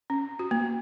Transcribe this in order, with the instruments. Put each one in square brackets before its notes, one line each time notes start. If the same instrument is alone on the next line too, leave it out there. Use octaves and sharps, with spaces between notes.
[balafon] C#4
F#4
A#3